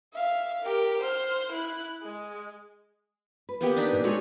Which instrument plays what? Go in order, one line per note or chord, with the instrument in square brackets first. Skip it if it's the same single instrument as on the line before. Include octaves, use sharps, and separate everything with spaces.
[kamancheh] E5 F5
G4 A#4
C5 F6
E4 F#6
G#3
[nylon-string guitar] B4
[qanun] A#3 B3 G4
D4 D#4 B5
[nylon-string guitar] A#2 D3 E3
[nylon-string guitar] G#3 F#4 G#4 [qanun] A4 C#5